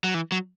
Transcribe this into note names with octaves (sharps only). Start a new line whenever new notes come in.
F#3
E3
F#3